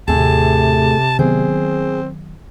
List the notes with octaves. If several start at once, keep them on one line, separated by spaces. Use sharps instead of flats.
D#2 A2 C3 A3 C4 G#4 A5
D#3 F#3 B3 C4 G#4